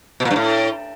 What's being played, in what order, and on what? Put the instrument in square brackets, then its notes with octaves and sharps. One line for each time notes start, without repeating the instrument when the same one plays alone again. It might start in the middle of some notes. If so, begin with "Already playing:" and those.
[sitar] B2
A#2
G2
A2